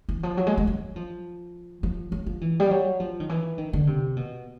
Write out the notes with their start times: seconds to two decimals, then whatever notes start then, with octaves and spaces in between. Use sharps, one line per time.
0.09 E3
0.23 F3
0.37 F#3
0.47 G#3
0.58 G#3
0.67 F#3
0.96 F3
1.83 F3
2.12 F#3
2.26 F3
2.41 E3
2.60 G3
2.70 F#3
3.00 F3
3.20 D#3
3.29 E3
3.58 D#3
3.73 D3
3.87 C3
4.17 B2